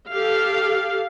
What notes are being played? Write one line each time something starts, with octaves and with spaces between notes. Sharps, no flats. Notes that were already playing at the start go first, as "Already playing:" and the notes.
G4 A4 F5